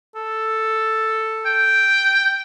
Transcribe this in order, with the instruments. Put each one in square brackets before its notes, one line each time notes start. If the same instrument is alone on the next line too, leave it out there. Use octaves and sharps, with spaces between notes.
[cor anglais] A4
[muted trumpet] G5